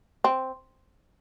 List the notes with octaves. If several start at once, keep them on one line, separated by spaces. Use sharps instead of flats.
C4